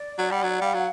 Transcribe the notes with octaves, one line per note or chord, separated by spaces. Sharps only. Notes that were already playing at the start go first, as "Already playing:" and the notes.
Already playing: D5
F#3 F#5
G3
F#3
G3 F5
F#3